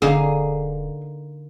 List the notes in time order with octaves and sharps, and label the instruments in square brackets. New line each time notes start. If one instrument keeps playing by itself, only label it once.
[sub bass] D#1 [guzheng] D3 A#3 D#4 [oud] G#4